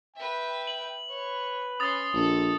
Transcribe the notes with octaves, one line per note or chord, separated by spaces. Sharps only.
B4 E5 G5
F#7
B4 C#5
C#4 C6 D#6 A6
A#1 A4